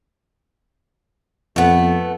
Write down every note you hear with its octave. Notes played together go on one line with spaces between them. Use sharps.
F2 A3 B3